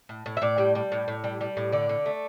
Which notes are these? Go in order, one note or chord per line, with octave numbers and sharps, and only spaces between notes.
A2
A2
E5
A2 D5
G3
G3
A2
A2
G3
G3
A2
D3 D5
D3
A3